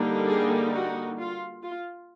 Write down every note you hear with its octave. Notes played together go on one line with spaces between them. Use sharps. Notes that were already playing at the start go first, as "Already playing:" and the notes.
Already playing: D3 G3 A#3 D#4
G#4
F#4
F4
F4